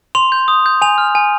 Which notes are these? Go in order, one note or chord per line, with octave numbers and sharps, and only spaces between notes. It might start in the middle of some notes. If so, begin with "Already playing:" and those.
C6 F7
G6
D#6
G6
G#5 F7
F6
G#5